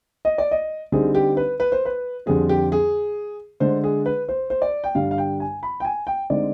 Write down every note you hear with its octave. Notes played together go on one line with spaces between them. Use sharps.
D#5
D5
D#5
D3 G3 C4 D#4 G#4
G4
B4
B4
C5
B4
F2 D3 G3 C4 G#4
G4
G#4
D3 G#3 D4 C5
G#4
B4
C5
C5
D5
G5
G2 D3 G3 D4 F5
F5
G5
G#5
B5
G5
G#5
G5
D3 G#3 C4 D#4 D5